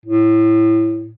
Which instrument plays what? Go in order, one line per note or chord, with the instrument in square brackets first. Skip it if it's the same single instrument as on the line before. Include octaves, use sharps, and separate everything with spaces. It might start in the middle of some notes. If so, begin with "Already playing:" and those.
[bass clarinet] A2